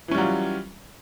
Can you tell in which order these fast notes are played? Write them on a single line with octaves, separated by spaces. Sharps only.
E3 C#4 G3 F#3 F4